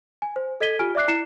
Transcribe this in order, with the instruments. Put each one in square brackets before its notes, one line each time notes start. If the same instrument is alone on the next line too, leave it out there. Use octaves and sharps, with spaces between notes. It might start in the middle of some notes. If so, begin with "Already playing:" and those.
[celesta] G#5
C5
A4 D#5 G#6 B6 D#7 G7
F4 G4 G#5 F6 D7
D5 E5 D6 F#6 C7
E4 C7 C#7 E7